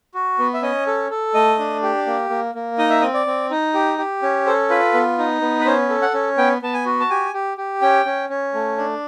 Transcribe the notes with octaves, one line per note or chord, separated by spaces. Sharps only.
F#4
B3
E5
C#4 D#5
A4
A4
A3 D#5
D4
G4
A#3
A#3
A#3
D#4 D#5
E5
C4 D#5
D5
C4
D#4
G4
G4
C#4
A4 C5
F4 B4
B3
D#4
B3
B4
C#4 C5
A4
F#5
C#4
B3 G5
B3 A5
G#5
F#4
A5
G4 G#5
G4
G4
C#4 G5
C#4
C#4
A3
D4